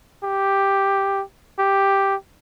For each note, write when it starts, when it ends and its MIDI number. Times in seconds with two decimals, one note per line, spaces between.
0.24 1.23 67
1.59 2.16 67